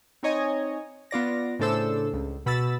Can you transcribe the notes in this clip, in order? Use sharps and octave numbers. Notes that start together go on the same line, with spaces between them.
C4 D#4 C#5 D#5 G#5
B3 F4 D5 A#6
A2 C#3 D4 A4 C5 E6
C#2
B2 B5 E6 A6